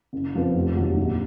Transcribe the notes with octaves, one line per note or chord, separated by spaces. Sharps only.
F#1
F2 F3 B3
F1
D#2 D#3 F#3
A#1